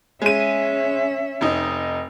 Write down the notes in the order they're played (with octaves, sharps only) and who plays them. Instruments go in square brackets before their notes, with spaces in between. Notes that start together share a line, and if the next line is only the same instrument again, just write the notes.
[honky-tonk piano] G#3 D#7 [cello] C#4 E5
[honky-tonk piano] F1 D#4